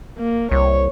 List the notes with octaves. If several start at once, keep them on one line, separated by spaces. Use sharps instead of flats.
A#3
C2 C#5